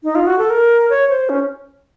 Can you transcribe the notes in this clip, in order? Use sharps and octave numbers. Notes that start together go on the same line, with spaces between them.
D#4
F4
F#4
A4
A#4
C#5
C5
C#4